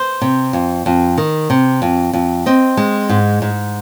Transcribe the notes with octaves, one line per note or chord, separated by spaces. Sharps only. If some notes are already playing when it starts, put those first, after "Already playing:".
Already playing: C5
C3
F2
F2
D#3
C3
F2
F2
C4 D#5
G#3
G#2
G#2